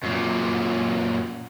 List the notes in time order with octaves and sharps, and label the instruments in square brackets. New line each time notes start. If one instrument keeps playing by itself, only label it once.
[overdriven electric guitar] F#2 A#2